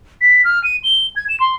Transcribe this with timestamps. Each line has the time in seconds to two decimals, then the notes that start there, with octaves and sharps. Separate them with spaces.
0.21 B6
0.45 F6
0.64 D#7
0.84 G7
1.16 G#6
1.29 E7
1.40 C6